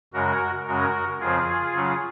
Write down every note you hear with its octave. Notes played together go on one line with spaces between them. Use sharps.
F#2 C#3 G#3 F#4 A#4
F#2 C#3 G#3 C#4 F#4 A#4
F2 C#3 F3 C4 F4 G#4
C#3 F#3 C#4